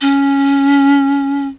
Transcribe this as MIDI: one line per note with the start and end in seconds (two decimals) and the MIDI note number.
0.01 1.47 61